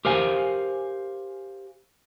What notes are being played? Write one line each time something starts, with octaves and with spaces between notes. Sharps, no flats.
G4 A#4 C5 F5 G#5